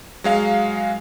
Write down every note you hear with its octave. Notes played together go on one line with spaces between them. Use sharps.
F#3 G#3 F5